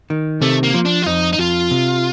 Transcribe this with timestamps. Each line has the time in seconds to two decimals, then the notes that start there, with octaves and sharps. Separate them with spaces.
0.10 D#3
0.41 C3 A3
0.63 A#3
0.74 F3
0.85 D4
1.02 F4
1.06 F2 D#4
1.33 D#4
1.38 F2 F4
1.71 C3